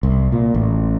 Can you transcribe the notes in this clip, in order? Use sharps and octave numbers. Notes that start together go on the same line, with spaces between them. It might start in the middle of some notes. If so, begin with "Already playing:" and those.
C2
A#2
A1